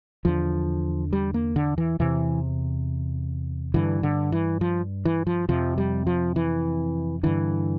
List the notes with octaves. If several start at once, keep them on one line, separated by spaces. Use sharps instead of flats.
E2 D3 F3
G3
A#3
D3
E3
E2 C3 E3
G2 D3 E3
D3
E3
F3
E3
F3
F2 C3 F3
G3
F3
E3
G2 D3 E3